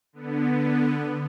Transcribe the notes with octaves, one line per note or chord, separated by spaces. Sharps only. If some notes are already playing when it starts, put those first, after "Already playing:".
D3 B3